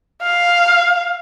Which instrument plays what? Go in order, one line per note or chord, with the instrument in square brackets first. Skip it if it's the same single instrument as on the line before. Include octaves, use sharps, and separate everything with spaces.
[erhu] F5